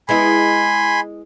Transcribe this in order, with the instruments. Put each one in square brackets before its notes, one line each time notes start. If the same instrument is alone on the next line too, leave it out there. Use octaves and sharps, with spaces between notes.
[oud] G#3 B3 E4 [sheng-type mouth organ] G#5 B5 C6